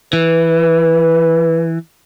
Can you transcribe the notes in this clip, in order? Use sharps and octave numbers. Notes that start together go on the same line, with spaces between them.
E3 B4